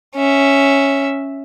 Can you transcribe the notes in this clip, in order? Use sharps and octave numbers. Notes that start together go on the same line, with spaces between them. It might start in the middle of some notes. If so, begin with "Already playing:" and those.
C#4 E5